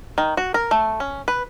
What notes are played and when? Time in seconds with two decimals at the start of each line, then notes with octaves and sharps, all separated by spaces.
0.18 D#3
0.37 F#4
0.54 A#4
0.71 A3
1.00 C#4
1.28 B4